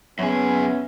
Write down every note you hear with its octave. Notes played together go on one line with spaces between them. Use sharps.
F#2 B3 C#4 E4 G#4 C#5 E5